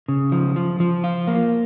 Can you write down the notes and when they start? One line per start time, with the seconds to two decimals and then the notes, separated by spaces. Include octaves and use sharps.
0.08 C#3
0.32 F3
0.56 F3
0.80 F3
1.04 F4
1.27 A#3